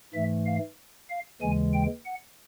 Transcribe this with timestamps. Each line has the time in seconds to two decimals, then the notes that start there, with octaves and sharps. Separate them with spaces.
0.14 G#2 E3 A3 E5
0.46 F5
1.10 F5
1.41 D#2 C#3 E3 G#3 G#5
1.74 G5
2.05 F#5